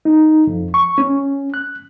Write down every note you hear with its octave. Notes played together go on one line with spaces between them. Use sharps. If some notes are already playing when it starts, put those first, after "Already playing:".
D#4
F2
C#6
C#4
F#6